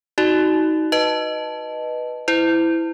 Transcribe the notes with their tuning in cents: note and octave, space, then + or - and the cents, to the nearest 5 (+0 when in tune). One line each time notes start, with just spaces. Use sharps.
D#4 +25 F#4 +10 D5 +35
B4 -5 D#5 -10 A5 -5
E4 +0 C5 -40